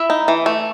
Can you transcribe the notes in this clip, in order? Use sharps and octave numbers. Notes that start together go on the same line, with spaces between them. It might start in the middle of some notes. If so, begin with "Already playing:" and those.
Already playing: E4 E5
D#4
E3
A3